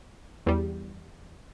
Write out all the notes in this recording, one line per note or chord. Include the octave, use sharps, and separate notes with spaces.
E2 G3